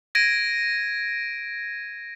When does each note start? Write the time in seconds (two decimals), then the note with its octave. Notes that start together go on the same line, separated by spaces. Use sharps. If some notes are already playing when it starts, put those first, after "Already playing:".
0.15 G#6 A#6 D7 D#7